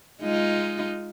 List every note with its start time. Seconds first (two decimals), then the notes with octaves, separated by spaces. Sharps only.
0.22 G#3 D#4 F4